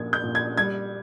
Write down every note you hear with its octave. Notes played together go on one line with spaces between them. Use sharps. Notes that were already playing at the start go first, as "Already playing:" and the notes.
Already playing: A#2 F3 G#6
G6
A#2
G#6
G3 G#6